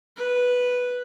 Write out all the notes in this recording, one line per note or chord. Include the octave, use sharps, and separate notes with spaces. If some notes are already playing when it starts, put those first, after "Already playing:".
B4